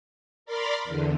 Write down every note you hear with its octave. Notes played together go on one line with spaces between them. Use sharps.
A#4 D5 B5 C6 D6 F6
E2 D3